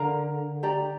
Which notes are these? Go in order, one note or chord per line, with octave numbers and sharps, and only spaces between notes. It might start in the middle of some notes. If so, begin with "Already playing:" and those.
Already playing: D3 A#4 F5 A#5
G4 D5 A#5